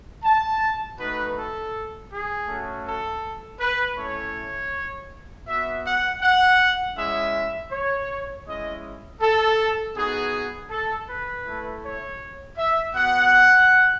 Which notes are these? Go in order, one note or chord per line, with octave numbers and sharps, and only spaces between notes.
A5
A3 D#4 F#4 B4
A4
G#4
A3 C#4 F#4
A4
B4
A3 C#4 E4 C#5
B3 F#4 E5
F#5
F#5
G#3 C#4 E4 E5
C#5
G#3 C#4 E4 D#5
A4
B3 D#4 F#4 G#4
A4
B4
A3 E4
C#5
E5
B3 F#4 F#5